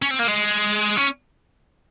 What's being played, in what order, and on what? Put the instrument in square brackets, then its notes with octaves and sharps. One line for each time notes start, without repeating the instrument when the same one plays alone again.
[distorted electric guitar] C#4
C4
A#3
G#3
C#4